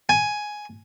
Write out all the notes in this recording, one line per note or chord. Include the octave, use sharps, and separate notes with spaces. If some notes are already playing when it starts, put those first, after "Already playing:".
G#5